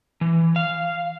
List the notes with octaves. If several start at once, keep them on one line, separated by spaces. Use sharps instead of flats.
E3
F5